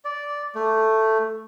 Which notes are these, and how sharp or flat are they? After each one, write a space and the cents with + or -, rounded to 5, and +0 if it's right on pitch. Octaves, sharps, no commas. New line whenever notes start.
D5 -10
A3 +5